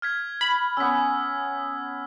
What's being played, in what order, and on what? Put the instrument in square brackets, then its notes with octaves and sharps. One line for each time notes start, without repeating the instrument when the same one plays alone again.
[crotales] F6 G#6 B6
[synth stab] B5
[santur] B3 C#4 [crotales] E6 B6